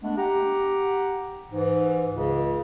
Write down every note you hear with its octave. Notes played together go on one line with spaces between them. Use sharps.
G#3 A3 B3 D4
G4 F#5 A#5
G#2 E3
C#2 C#3